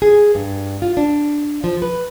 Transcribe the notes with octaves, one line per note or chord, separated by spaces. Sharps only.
G#4
G2
F4
D4
F3
B4